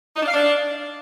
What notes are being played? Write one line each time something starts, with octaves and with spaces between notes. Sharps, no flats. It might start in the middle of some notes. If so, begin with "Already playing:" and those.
D#4
D4
F5
D4